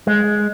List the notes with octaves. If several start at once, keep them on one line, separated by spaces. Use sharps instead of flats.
G#3